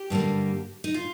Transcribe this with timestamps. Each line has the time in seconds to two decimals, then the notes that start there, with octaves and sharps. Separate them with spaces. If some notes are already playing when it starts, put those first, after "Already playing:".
Already playing: G4
0.10 G2 D3 G3 A#3
0.84 D#4
0.94 F4